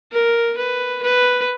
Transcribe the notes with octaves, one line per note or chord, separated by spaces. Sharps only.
A#4
B4
B4